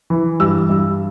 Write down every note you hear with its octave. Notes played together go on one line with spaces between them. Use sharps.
E3
G2 E6
G2